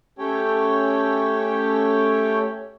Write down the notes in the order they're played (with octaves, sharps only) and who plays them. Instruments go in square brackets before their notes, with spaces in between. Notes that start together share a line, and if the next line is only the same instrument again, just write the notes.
[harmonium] A3 C#4 G4 A4 C#5 G5